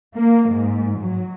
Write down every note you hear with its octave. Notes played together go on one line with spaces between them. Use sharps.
A#3
G#2
F#3